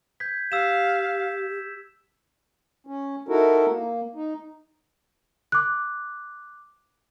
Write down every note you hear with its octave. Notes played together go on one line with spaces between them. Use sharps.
G6 G#6 B6
G4 F5 E6 B6 E7
C#4
D#4 E4 F#4 A4 A#4
A#3
D#4
D6 F#6